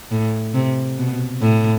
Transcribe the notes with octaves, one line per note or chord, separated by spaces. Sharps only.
A2
C3
B2
A2